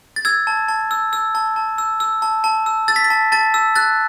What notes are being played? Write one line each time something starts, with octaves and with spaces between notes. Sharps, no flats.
A6
E6 G#6
A5
A5
E6
E6
A5
A5
E6
E6
A5
A5
E6
E6 A6
B6
A6
A5
A5 A6
E6
F#6 A6